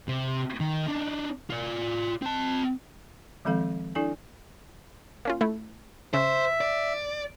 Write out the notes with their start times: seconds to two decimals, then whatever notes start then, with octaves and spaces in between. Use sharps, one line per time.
0.08 C3
0.60 D#3
0.87 D4 D#4
1.50 F4 D5
2.22 C4 A5
3.45 D#3 F3 G#3 C4 A4 F5
3.95 D4 E4 A4 D5 G#5
5.25 A#3 C#4 F4
5.41 A3 E4
6.14 C#3 C5 E5
6.61 D5